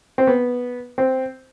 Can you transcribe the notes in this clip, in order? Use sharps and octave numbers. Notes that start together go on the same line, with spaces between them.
C4
B3
C4